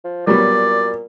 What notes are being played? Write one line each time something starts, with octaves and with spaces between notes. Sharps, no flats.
F3
A#2 F#3 G3 B3 D5